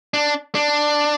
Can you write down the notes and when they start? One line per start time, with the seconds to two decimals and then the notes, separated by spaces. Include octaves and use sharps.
0.14 D4
0.55 D4